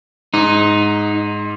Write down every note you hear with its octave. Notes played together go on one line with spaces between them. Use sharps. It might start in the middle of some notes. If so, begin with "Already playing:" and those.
G#2 D#4